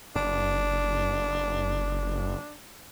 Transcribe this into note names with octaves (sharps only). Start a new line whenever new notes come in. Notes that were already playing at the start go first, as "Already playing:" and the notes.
F#1 D4